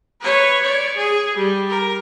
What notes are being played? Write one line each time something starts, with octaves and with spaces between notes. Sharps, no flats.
B4 C#5
C#5 D5
G#4
G3
A#4